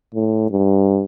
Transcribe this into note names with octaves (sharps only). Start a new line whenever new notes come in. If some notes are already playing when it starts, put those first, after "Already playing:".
A2
G2